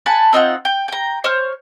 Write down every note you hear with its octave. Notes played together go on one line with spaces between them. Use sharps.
F#5 G#5 A5 B5
C4 D#4 F4 F#5
G5
G5 A#5
C5 C#5 F6